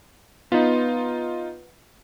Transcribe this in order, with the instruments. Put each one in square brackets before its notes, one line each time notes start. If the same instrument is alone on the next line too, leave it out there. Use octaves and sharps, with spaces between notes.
[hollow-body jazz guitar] B3 [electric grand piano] D#4 F4